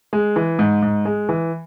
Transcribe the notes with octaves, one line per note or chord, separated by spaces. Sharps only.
G#3
E3
G#2
G#2
G#3
E3